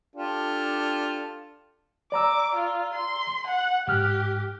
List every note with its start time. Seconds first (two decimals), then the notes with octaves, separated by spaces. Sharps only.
0.16 D4 F4 G4 A4
2.12 D5 A#5 D6 E6
2.55 F4
2.94 C6
3.47 F#5
3.88 G#2 G4 F6 F#6